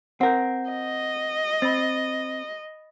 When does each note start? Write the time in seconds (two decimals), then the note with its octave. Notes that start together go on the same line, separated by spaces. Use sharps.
0.21 C4 A#4 F#5 G6
0.70 D#5
1.62 C4 B5 A6